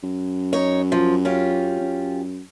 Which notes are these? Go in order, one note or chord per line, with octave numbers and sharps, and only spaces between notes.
F#2
D#4 C#5
F3
C#4 F4 G4
F#2